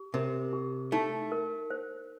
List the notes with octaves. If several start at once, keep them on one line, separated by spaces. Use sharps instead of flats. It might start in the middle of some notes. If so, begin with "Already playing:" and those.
Already playing: G4
C3 A#4
G4
A3 D#4
A#4
C5